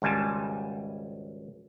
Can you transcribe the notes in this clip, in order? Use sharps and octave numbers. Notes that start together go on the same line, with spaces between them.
G#1 C#2 G3 G#5 A5